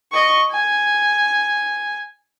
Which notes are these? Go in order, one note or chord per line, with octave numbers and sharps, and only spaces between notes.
D#5 C#6
G#5